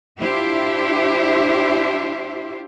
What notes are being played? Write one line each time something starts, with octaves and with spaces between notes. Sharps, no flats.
D4 E4 F4 G4 C5 E5